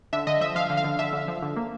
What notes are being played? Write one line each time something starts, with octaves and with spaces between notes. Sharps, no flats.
D3 E5
D3 D#5
F3 E5
F3 F5
D3
F5
D3
D3 E5
D3
F3
D3
A#3